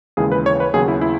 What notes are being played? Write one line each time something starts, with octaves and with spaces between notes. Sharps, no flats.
D#2 C#3 E3 G#3 G#4
B4
C#5
B4
D#2 C#3 F#3 B3 G#4
E4
E4